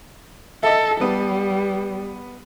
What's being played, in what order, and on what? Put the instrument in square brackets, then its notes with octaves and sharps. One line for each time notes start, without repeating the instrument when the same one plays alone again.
[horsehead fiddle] A4 [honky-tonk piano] D#5 E5
[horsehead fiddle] G3 [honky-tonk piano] B3